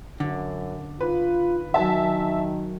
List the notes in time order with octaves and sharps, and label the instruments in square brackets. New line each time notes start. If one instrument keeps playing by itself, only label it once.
[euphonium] F#2 [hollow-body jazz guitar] D3
[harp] D#4 [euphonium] F4 [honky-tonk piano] B4
[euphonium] D#3 [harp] F#3 F#4 G#5 [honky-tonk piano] E5 A5